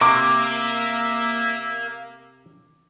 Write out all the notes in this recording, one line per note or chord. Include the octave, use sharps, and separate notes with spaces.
C3 A#3 E5 D6